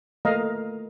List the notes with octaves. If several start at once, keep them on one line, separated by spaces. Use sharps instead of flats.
A3 A#3 A#4 D#5 F5 A#5